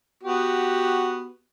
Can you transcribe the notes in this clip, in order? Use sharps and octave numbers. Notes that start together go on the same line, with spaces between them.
B3 F#4 G4